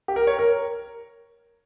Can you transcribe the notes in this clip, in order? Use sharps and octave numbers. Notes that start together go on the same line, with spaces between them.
G4
A#4
C#5
A#4